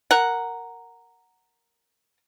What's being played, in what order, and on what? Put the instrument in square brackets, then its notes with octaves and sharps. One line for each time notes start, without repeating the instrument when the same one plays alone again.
[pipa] A#4 F#5